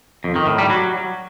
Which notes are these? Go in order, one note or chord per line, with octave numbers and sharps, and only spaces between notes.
F2
D#3
A2
G3
F#3